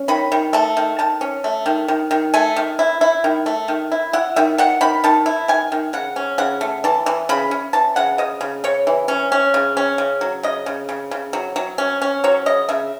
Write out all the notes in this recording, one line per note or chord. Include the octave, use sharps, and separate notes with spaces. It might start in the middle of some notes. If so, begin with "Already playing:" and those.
Already playing: C#4
D#3 B5
D#3
A3 A5
D#3
D#3 A5
C#4
A3
D#3
D#3
D#3
A3 G#5
D#3
E4
E4
D#3
A3
D#3
E4
E4 F#5
D#3 E5
D#3 F#5
D#3 B5
D#3 A5
E4
D#3 G#5
D#3
C#3 F#5
C#4
C#3 F#5
A3
E3 A5
E3
C#3 B5
C#4
E3 A5
C#3 F#5
C#3 D#5
C#3
C#3 C#5
E3
C#4
C#4
C#3
C#4
C#3
F#3
C#3 D#5
C#3
C#3
C#3
F#3
F#3
C#4
C#4
F#3 C#5
C#3 D#5
C#3 E5